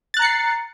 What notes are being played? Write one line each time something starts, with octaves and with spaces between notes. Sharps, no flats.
A#5 F#6 A6 C7 C#7